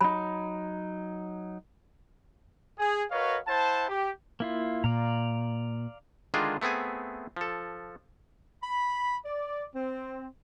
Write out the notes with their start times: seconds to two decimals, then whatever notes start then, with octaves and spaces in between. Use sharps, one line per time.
0.01 F#3 D#4 B5
2.79 G#4
3.11 F#4 A#4 B4 C#5 D#5 F5
3.47 E4 C5 F#5 A5
3.89 G4
4.40 A#3 E4 F4
4.84 A#2 D5 F5 A#5
6.34 D3 D#3 G#3 D4 F4 G#4
6.61 A3 B3 C4 G#4 G#5
7.37 F3 A4
8.63 B5
9.24 D5
9.76 C4